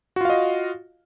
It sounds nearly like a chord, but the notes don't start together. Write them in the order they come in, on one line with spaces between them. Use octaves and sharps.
F#4 F4 F5 D#5